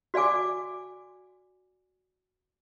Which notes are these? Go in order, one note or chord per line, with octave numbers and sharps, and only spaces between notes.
F#4 D5 F5 G#5 D6